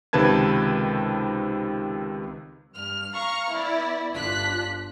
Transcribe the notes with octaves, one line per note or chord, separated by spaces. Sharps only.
C#2 C3 D#3 B4 A5 G#6
G2 F6
F5 A#5 C#6 F6
B3 E4 D5
G1 D4 F4 F#6 B6